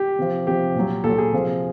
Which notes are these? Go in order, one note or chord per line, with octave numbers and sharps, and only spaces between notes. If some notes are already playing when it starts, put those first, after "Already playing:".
Already playing: G4
C3 F3
C3 F3 G4
A#2 F#3
A#2 F#3 A4
G#4
C3 F3